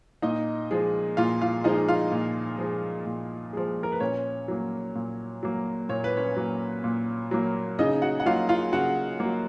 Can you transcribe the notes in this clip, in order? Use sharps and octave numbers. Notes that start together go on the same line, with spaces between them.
A#2 D#4 D#5
F3 G#3
A#2 F4 F5
F4 F5
F3 G#3 D#4 D#5
F4 F5
A#2
F3 G#3
A#2
F3 G#3
A#4
B4
A#2 C#4 C#5
F#3 A#3
A#2
F#3 A#3
A#2 C#5
B4
C#4 C#5
F#3 A#3
A#2
F#3 A#3
C#3 D#4 D#5
F#4 F#5
F#5
F#3 A#3 F4 F5
F4 F5
C#3 F#4 F#5
A#3
F#3